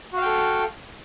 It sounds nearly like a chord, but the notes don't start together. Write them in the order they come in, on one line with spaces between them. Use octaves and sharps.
F#4 F5 G5 A4